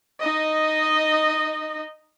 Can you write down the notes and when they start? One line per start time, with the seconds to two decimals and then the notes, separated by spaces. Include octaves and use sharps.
0.20 D#4 D#5